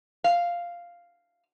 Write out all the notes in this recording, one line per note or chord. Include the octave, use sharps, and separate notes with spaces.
F5